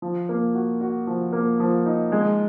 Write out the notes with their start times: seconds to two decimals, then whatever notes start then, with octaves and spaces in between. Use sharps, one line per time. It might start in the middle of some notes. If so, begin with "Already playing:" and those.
0.02 F3
0.29 A#3
0.55 F#4
0.81 F#4
1.07 F3
1.33 A#3
1.60 F3
1.86 D#4
2.12 G#3